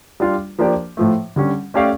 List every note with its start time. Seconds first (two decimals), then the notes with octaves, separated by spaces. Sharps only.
0.20 G3 D4 F4
0.59 F3 A#3 D4 G4 D5
0.97 A2 F3 A3
1.36 D3 G3 C#4
1.74 A3 C#4 G4 D5 F5